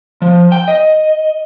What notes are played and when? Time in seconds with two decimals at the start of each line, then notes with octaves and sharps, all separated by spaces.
0.22 F3
0.52 G5
0.68 D#5